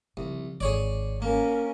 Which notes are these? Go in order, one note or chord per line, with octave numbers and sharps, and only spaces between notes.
C2 C#3 F3
G#1 G#4 C#5 D5
A#3 C#4 A#4